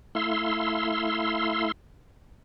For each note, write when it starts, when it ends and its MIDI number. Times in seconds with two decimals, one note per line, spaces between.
0.15 1.72 57
0.15 1.72 64
0.15 1.72 77
0.15 1.72 84
0.15 1.72 88